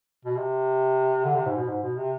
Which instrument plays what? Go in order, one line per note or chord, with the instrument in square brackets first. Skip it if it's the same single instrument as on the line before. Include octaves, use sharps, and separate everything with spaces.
[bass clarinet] B2
C3
D3
C3
G#2
B2
G#2
B2
C3